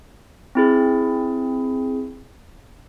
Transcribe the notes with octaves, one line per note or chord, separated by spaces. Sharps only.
C4 E4 G#4